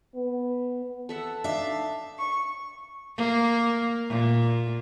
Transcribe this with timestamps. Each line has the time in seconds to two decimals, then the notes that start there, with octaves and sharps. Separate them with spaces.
0.15 B3
1.09 A4 E5 F#5
1.44 D4 D#4 E5 F5
2.18 C#6
3.17 A#3
4.08 A#2